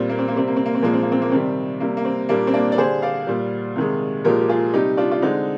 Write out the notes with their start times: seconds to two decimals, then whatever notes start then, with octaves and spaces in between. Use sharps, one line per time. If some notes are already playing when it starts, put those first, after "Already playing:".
Already playing: A#2 G3 C4
0.09 A#3
0.19 C4
0.28 A#3
0.34 C3 G3 C4
0.47 A#3
0.57 C4
0.66 A#3
0.75 C4
0.82 A#2 F3 G#3 A#3
0.94 C4
1.03 A#3
1.12 C4
1.22 A#3
1.32 C3 D#3 G3 C4
1.80 C3 G3 A#3
1.97 A#3
2.05 C4
2.29 A#2 G3 A#3 D4
2.47 C4
2.54 A#3 D4
2.72 D5
2.78 D3 G3 G#4 C5
3.02 D5 F5
3.27 A#2 G3
3.76 C3 D#3 G#3
4.25 A#2 F3 G#3 G4 A#4
4.41 G4
4.49 F4 G#4
4.73 C3 G3 D#4 G4
4.97 D4 F4
5.12 F4
5.22 D3 G#3 C4 D#4